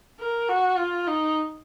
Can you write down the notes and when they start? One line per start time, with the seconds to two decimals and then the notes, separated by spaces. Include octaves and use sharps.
0.20 A#4
0.49 F#4
0.78 F4
1.07 D#4